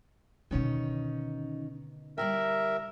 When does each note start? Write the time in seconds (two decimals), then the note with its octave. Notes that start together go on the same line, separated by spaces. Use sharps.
0.51 B2 D3 D#3 C#4 D#4
2.18 G3 E4 A#4 E5 G5